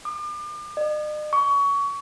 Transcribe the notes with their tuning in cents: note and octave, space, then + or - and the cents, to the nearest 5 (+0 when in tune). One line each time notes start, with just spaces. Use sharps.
D6 +40
D#5 -45
C#6 +25